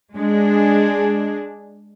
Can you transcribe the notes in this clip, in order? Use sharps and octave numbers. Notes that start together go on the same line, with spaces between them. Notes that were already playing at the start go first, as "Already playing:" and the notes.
G#3 D4 G#4